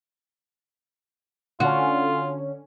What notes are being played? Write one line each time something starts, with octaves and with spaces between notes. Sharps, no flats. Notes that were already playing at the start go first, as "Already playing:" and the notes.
D3 C#4 F4 F#4